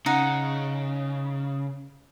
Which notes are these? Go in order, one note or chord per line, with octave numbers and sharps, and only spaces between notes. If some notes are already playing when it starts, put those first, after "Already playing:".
C#3 D#4 F#5